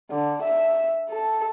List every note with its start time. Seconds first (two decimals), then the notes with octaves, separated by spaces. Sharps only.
0.11 D3
0.42 E5
1.10 A4